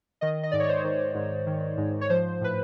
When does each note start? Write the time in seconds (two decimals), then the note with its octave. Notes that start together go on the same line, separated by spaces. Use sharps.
0.21 D#3 D#5
0.43 D#5
0.51 G#2 D5
0.60 C#5
0.69 C5
0.84 D#3
1.15 G#2
1.47 D#3
1.77 G#2
2.01 C#5
2.10 F3 C5
2.41 A2 B4